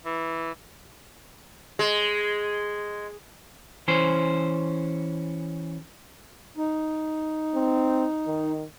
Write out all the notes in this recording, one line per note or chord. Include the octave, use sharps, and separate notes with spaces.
E3
G#3
E3 C#4 C5
D#4
C4
D#3